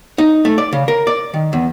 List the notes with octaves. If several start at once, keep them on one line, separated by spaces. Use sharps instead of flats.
D#4
A3
D5
C#3
A#4
D5
D#3
E2